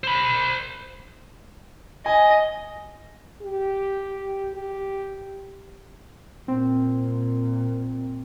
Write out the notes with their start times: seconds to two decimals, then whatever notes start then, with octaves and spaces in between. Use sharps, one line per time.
0.04 C5 B5
2.06 D#5 G#5
3.42 G4
4.54 G4
6.48 A#2 C4